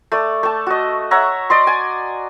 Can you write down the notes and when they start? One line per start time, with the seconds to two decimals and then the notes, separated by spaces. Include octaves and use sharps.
0.12 A3 D5
0.43 A3 A5
0.67 F#4 D#5
1.11 C#5 E5 F#5 A#5
1.50 D5 D#5 C6
1.67 G#5